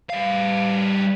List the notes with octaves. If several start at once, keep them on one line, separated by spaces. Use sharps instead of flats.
G3 F5